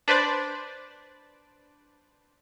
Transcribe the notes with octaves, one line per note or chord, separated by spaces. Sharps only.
D4 B4 C5 D5